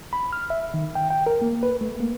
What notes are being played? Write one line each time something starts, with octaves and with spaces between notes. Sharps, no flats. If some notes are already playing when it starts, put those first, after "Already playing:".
B5
F6
E5
D#3
G5
G5
A#4
A#3
B4
A3
A#3